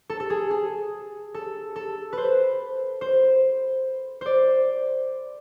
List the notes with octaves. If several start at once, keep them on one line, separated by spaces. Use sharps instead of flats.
A4
A4
G#4
G#4
A4
A4
B4 C5
C5
C5 D5